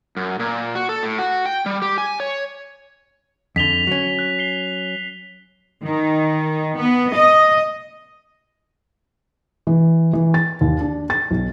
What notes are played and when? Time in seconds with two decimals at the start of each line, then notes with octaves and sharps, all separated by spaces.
0.17 F#2
0.39 A#2
0.75 F#4
0.89 A4
1.03 A2
1.19 F#4
1.46 G5
1.66 G3
1.82 G4
1.98 G#5
2.20 C#5
3.56 F2 D3 B6 F7 G7
3.87 F#3 C#4
4.19 F#6
4.39 C7 G7
5.84 D#3
6.77 B3
7.15 D#5
9.67 E3
10.13 E3
10.34 A6
10.61 D#2
10.81 D4
11.10 A6
11.31 B1